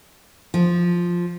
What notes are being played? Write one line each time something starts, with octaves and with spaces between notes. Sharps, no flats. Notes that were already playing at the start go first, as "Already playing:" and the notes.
F3